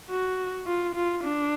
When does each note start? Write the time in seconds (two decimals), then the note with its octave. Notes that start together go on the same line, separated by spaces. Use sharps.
0.10 F#4
0.67 F4
0.95 F4
1.24 D4